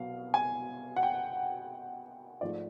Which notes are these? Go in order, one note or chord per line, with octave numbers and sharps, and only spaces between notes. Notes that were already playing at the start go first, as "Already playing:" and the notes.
Already playing: C2 B2 F#3 B3 F5
G#5
F#5
G5
G#2 F3 A3 D5